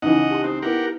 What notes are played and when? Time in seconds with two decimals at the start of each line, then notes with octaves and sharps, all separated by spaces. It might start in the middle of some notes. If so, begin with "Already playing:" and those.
0.02 C#2 E3 D#4 D#5 F#5
0.31 G4 A5 C6
0.44 C4 C5 D#6
0.62 B3 E4 G4 A#4 F#5